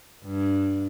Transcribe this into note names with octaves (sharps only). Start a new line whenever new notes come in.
G2